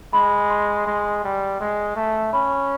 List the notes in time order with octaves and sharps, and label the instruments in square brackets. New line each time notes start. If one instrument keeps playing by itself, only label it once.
[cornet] G#3 [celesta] B5
[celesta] C6
[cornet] G#3 [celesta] C6
[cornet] G3
G#3
A3
[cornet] C#4 [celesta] B5
[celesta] C#6